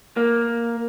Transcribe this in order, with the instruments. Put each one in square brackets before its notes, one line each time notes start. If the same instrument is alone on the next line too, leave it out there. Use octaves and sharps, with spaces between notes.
[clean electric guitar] A#3